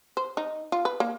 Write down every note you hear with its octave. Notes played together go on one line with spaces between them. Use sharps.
C5
D#4
F4
B4
A#3